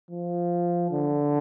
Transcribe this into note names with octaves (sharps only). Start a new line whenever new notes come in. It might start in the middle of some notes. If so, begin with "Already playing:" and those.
F3
D3